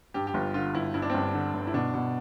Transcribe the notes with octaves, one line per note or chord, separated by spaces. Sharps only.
G2 G4
G4
G1 F4
D3 F4
G1 E4
G2 E4
D4
C4
G1 D4
D3
G1
E4
B2 D4
B2